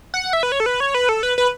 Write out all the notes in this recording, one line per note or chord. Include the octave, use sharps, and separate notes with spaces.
F#5
E5
B4
C#5
A4
B4
C#5
B4
A4
B4
B4